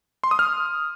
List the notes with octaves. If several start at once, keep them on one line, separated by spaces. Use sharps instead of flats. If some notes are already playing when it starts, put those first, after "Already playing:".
C6
D#6
F6